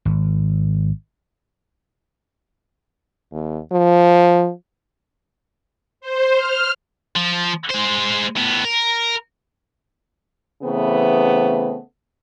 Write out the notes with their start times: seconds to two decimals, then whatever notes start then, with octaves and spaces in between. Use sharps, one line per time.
0.05 G#1
3.32 D#2
3.72 F3
6.01 C5
6.36 F6
7.16 F3
7.71 G#3 C5
8.37 A2 B3
8.65 A#4
10.63 C#3 E3 A3 B3 C4